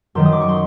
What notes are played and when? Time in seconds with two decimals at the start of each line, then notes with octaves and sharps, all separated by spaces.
0.15 F#2 D#3 F#3 C6
0.26 D#6
0.33 D6
0.41 C#6
0.48 C6